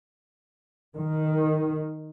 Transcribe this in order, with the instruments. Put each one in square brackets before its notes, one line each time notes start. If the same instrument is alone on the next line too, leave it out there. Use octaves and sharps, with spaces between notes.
[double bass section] D#3